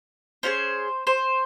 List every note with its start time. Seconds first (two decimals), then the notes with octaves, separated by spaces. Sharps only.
0.43 C#4 F4 G#4 C5
1.07 C5